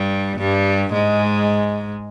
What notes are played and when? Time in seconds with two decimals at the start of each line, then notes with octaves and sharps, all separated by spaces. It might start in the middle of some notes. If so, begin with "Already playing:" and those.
Already playing: G2 G3
0.39 G2 G3
0.93 G#2 G#3